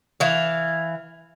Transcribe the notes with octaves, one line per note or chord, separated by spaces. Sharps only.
E3 F5